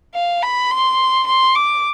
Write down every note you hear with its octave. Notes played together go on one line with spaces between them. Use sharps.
F5
B5
C6
C6
D6